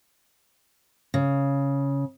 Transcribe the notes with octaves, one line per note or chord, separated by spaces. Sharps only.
C#3